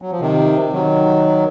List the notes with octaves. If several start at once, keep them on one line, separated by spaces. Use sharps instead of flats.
F#3
F3
C3 D#3
D#3 F#3